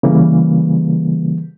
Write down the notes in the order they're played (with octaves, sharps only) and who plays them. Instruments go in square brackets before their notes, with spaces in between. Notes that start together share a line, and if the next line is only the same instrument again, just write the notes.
[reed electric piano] C#3 E3 G3 A#3